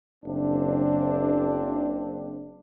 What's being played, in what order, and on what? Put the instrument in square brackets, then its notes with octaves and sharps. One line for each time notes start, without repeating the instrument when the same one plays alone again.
[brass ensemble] F#1 C4 D4